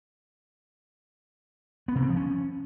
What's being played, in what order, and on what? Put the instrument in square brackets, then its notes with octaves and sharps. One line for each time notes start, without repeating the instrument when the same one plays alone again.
[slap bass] B3
C3
C4
F3
C#4